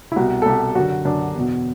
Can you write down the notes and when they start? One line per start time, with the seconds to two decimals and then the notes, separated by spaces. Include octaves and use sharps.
0.12 E4
0.16 C2 F#4
0.20 B2
0.42 A4
0.46 C2 B2 G4
0.75 F#2 F#4
0.79 D3
1.05 F#2 D3 D4
1.35 E2 B2